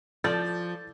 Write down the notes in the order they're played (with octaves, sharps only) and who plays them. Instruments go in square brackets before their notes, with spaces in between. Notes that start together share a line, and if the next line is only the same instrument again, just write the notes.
[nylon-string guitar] F3 [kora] F4 A4 D5 [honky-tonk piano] G6 A6